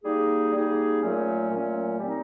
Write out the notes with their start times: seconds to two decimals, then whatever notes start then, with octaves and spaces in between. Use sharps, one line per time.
0.03 G3 A#3 D#4 G#4
0.53 G3 A#3 D#4 G#4
1.01 A#2 F#3 A3 C#4
1.51 A#2 F#3 A3 C#4
2.00 G3 C4 D#4